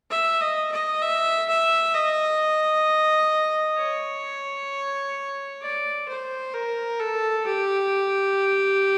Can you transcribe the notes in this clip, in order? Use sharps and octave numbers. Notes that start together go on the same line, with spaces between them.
E5
D#5
D#5
E5
E5
D#5
C#5
D5
C5
A#4
A4
G4